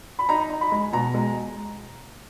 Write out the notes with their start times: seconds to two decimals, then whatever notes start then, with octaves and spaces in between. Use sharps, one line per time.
0.19 B5
0.29 D#4 A#5
0.50 D#4
0.61 B5
0.72 G#3
0.93 B2 A#5
1.14 G#3